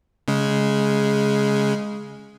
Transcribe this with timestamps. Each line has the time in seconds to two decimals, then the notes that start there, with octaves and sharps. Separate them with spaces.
0.28 C#3 G#3